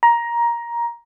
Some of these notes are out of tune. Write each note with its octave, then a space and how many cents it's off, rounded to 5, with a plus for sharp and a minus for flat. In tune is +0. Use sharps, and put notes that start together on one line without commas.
A#5 +15